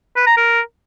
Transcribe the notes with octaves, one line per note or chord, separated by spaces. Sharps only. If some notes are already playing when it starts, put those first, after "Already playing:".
B4
A#5
A#4